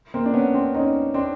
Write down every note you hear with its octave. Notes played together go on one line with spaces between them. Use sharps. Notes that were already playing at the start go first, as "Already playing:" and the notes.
A#3 C4
D4
B3 C#4
C4 D4
C#4 D#4
C4 D4